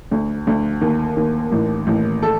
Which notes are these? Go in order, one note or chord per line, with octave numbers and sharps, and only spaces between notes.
D2
D2
D#2
D#2
A1
A1
A4